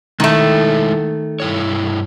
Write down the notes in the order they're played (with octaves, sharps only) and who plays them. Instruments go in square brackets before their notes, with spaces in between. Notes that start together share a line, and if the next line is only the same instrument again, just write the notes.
[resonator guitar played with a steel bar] D#3 A3 [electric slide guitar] G#3 E4 E5
[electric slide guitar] G2 E4 C#5